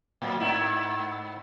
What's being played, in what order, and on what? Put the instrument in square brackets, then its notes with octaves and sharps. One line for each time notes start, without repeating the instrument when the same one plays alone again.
[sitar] A2 F#3
G#2 D#4 E4